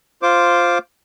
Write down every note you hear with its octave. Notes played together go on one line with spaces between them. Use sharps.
F4 C5 D6